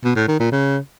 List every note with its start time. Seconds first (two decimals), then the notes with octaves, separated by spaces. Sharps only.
0.04 B2
0.16 A2
0.28 D#3
0.40 A#2
0.52 C#3